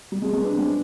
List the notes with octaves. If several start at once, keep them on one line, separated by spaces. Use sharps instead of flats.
G3
G#3
G#3
B3 D4
G#3 C4